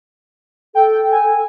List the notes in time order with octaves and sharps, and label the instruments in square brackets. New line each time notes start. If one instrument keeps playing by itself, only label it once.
[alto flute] A4 [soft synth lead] G5
[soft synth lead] G#5